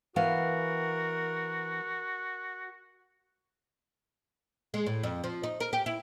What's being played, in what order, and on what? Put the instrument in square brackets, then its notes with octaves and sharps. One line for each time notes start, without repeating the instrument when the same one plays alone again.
[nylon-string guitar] E3 B3 F5 [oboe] F#4 [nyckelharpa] A#4
[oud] G#3
A2
F2
F3
D#4
A#4
G4
E4